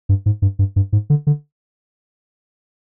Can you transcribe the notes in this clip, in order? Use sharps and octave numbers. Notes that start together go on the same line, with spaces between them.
G2
G#2
G2
G2
G2
G#2
D3
D3